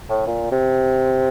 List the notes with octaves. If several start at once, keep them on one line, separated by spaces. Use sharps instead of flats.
A2
A#2
C3